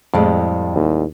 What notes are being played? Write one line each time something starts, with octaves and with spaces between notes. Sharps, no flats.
F2 A2 G3 G#3
D#2